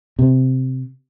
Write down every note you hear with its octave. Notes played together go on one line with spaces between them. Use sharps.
C3